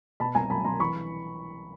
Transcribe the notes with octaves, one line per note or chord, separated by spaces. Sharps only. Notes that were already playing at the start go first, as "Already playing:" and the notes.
B2 A5 B5
C2 G#5 A#5
F#3 A5 B5
C2 A#5 C6
E3 B5 C#6